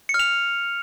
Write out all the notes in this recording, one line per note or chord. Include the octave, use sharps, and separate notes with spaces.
C#7
F6
F7